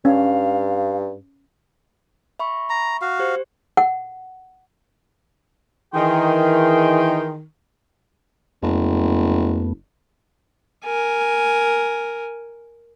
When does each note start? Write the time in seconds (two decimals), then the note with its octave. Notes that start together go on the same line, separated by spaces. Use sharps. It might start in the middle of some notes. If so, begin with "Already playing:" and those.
0.05 G2 C#4 F5
2.39 E5 B5 C#6
2.70 A#5
3.01 F#4 F5
3.19 G4 C5
3.77 F#5
5.95 D#3 E3 G#4 G5 C6
8.62 F#1 F2 A3 B3
10.85 A#4 G#5